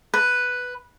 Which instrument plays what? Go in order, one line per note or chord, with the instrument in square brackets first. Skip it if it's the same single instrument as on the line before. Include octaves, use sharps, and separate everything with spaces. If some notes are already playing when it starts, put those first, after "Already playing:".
[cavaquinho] B4